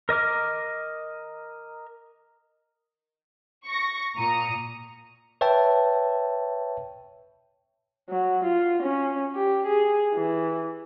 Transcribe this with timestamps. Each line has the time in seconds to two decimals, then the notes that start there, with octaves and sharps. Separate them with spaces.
0.09 A#4 D#5 D6 F6
3.67 C#6 A#6
4.17 A#2 A#5 D#6 C#7
5.41 B4 C#5 E5 G5 A5
8.09 F#3
8.44 F4
8.83 C#4
9.35 G4
9.67 G#4
10.15 E3